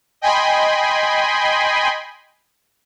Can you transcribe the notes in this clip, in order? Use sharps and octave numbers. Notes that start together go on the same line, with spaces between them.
D#5 G5 G#5 B5 C6